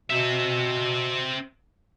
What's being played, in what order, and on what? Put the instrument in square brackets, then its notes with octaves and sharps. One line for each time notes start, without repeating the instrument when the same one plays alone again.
[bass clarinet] B2 [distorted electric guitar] C4 E5